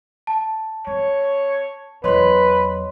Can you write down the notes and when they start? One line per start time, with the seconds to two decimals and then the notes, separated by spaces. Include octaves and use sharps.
0.27 A5
0.87 C4 C#5
2.04 E2 F#3 B4 C#5 D#5 B5 C6